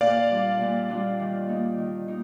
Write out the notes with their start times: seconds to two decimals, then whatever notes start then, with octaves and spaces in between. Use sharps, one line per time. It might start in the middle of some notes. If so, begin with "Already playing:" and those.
0.01 A#2 D5 F5
0.31 G3 D4 F4
0.61 A#2
0.90 G3 D4 F4
1.20 D#3
1.49 A#3 D#4
1.78 D#3
2.08 A#3 D#4